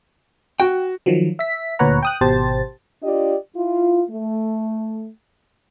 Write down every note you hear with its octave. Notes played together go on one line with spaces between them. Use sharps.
F#4 G5
D#3 F3 F#3
E5 B6
D2 A#2 B4 C#5 F#5 A#5
G5 D#6 F#6
G#1 B2 G4 C5 A5 A6
D4 F4 G4 D5 D#5
E4 F4
A3